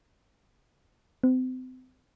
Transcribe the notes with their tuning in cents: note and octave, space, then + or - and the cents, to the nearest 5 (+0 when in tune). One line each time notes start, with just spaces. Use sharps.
C4 -35